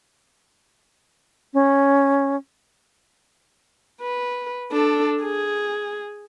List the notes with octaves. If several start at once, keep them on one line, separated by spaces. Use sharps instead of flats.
C#4
B4
D4 A4
G#4